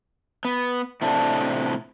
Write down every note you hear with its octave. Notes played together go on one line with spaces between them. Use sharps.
B3
A2 C3 A3 D4